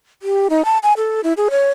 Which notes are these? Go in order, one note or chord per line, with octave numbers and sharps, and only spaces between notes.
G4
D#4
A5
G#5
A4
E4
G#4
C#5